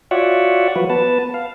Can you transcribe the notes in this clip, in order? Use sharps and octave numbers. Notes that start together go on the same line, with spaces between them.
F4 F#4 C#5 D5 E5 F#5
F3 F#3 B4
B3 B4 A5
F5